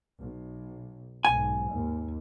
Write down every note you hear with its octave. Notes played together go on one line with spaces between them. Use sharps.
B1
B1 G#2 G#5
D#2